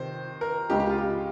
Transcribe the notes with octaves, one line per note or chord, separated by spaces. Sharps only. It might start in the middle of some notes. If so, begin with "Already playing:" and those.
Already playing: C3 D#3 C5
A#4
C#2 C#3 G#3 G4
G4
F4
G4